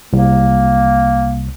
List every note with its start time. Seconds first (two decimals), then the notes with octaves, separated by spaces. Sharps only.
0.13 C2 A#3